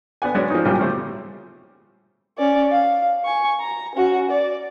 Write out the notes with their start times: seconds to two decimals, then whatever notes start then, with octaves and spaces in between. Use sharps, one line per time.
0.22 B3 D4 F#5 G#5
0.35 F#3 G#3 B3 C#4 D4
0.50 F3 D#4
0.65 G2 A#2 C#3 F3 F#3 G4
0.80 D3 G3 A3 C5
2.38 C#4 D5
2.72 F5
3.25 G#5 C#6
3.60 A#5
3.95 C#4 F#4
4.31 D5